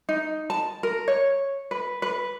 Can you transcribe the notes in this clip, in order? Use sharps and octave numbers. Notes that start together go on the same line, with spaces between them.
D#4
A5
A#4
C#5
B4
B4